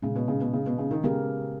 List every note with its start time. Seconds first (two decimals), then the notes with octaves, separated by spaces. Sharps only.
0.03 A#2 C#3 G#3 C#4
0.16 B2
0.28 C#3
0.41 B2
0.53 C#3
0.66 B2
0.78 C#3
0.91 D#3
1.04 C#3 G#3 B3 G4 A#4